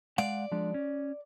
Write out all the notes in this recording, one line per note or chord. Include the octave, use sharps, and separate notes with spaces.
G#3 D5 F5 F#5
F3 G#3 D4
C#4